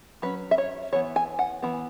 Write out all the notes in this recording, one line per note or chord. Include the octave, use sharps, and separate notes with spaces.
F#3 C#4 B4
E5
C#5
E3 B3 C#5
G#5
F#5
E3 B3